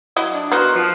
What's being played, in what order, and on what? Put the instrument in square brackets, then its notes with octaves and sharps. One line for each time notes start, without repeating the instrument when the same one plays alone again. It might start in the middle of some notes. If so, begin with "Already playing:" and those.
[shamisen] F#3 E4 D#5
[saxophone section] D4
[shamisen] B3 D#4 [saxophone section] F#4 A#4 C5
[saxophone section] F3